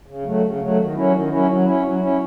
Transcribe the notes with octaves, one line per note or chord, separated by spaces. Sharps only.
C#3
F#3 A3
C#3
F#3 A3
D#3
F#3 C#4 E4
D#3
F#3 C#4 E4
F#3
C#4 E4
F#3
C#4 E4